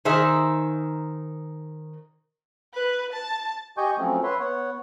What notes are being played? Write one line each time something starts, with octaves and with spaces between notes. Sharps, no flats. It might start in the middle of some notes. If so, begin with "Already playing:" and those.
D#3 D#4 G#4 C5 E5
B4
A5
G4 D#5 G#5 C#6 G6
F3 F#3 A3 C4 C#4
B4 C#5 E5 C6
B3 C#5 F#5